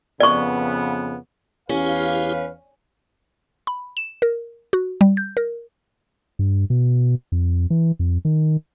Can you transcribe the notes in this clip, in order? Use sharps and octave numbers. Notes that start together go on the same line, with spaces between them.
F2 C#3 B3 D5 C#6
E2 C#4 E4 G4 B4 F5
B5
E7
A#4
F#4
G3
G6
A#4
G2
B2
F2
E3
F2
D#3